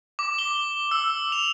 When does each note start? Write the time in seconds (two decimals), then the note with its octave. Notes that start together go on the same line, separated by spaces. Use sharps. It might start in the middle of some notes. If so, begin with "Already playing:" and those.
0.19 D6
0.39 G7
0.91 E6
1.32 F7